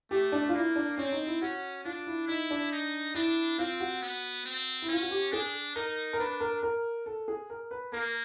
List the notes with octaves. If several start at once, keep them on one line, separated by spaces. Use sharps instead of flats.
A3 G4
D4
F4
A#3 E4
D4
C4 C#4
D#4
E4
C#4 F#4
D4 F4
E4
D#4 E4
D4
D#4
D4 E4
C4 F4
F#4
B3
C4
E4
C#4 F4
F#4
G4
D4 G#4
D#4 A#4
A#4
D4 B4
A#4
A#4
A4
G#4
A#4
B4
A#3 A#4